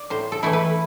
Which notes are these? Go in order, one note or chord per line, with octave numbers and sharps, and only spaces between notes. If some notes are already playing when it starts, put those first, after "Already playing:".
Already playing: D5
A2 C5
A4
E3 A3 E4
B4